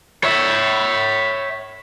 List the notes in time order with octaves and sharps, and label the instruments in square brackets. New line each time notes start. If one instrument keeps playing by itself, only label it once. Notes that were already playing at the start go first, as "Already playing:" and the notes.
[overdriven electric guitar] C#5 E5